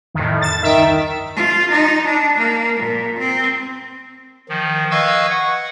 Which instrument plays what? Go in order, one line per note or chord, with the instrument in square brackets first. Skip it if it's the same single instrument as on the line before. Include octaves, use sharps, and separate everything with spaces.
[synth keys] F2 [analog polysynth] A2 D#3
[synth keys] F2 E7 [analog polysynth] A6
[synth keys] C#2 G2 D7 [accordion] D#3 [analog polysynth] E5
[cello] F4
D#4
D4
A#3
A#2
C4
[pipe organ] D#3 F3
B4 D#5 F5 C#6 E6 G#6
F#5